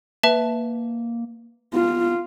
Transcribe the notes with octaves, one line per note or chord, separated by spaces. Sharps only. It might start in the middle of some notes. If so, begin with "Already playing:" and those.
A#3 B4 E5 A5
B3 F4